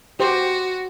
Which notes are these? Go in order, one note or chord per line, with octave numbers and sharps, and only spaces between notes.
F#4 G4 C5